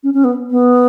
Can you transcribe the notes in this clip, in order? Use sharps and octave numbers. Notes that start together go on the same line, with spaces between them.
C#4
C#4
B3
B3